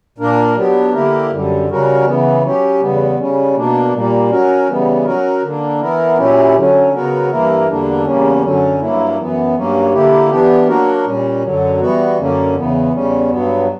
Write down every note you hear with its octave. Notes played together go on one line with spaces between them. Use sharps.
A#2 A#3 D4 A#4
F#3 B3 D4 G4
D3 A#3 E4 G4 A#4
F#2 D3 G3
C#3 G3 C#4 F#4 A#4
C#3 E3 B3
F#3 C#4 G4
E2 C#3 G3 B3
C#3 G3 C#4
B2 A#3 D4
A#2 G3 A#3
F#3 C#4 F#4 A#4
C#3 E3 G3 B3
F#3 C#4 F#4 A#4
D3 A#3 D4
E3 B3 E4 A#4
A#2 F#3 C#4 E4 G4
D3 F#3 C#4
C#3 F#3 B3 F#4 A#4
G2 E3 A#3 E4 A#4
E2 D3 G3 A#3 D4
E2 C#3 G3 A#3 C#4
F#2 D3 F#3 C#4
G2 F#3 A#3 E4
F#2 E3 B3
G2 F#3 A#3 C#4
D3 A#3 E4 G4
E3 B3 D4 G4
F#3 A#3 D4 F#4 A#4
A#2 G3 C#4
F#2 D3 F#3
E3 G3 B3 F#4
F#2 D3 A#3 C#4
E2 C#3 E3 B3
E2 C#3 G3 C#4
G2 F#3 B3